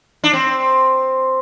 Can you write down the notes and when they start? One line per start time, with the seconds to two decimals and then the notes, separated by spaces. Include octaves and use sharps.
0.24 D4
0.33 C4